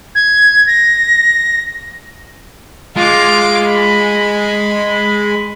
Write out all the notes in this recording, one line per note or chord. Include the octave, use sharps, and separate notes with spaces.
G#6
A#6
G#3 F4 D6
B5